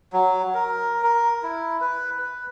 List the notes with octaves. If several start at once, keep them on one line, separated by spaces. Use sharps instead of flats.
F#3
A#4
A#4
E4
B4
B4